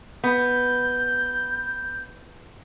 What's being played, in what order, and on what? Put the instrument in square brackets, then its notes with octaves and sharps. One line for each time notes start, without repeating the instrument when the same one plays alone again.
[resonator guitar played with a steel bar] B3 [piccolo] G6